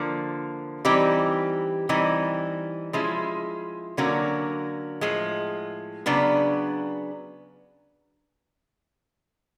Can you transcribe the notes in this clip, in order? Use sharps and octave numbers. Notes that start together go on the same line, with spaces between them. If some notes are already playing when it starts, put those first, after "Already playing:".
Already playing: D3 F3 A#3
E3 G3 C4 D#4 G4
E3 G3 C4 D#4
F3 G#3 C#4 E4
D3 F#3 A#3 C#4 F#4
A2 F3 G#3
C#3 F#3 B3 D4